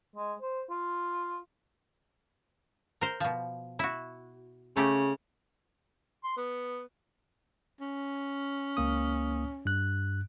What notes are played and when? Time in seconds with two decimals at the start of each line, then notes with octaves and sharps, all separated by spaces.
0.16 G#3
0.41 C5
0.70 F4
3.01 A#4 C5
3.20 B2 F3
3.79 E4 F#4
4.77 C#3 A3 G4
6.24 C6
6.37 B3
7.81 C#4
8.77 C#2 A#3 D#6
9.65 G2 F#6